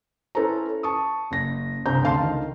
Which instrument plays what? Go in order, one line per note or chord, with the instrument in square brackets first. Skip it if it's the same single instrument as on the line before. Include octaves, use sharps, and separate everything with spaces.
[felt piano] C#4 E4 A4 B4 C5 A#5
A5 C#6 D#6
F#1 A#6
C2 G2 C#3 C5 A#5 G6
D2 C4 F5 A5 C6
C#2 D#3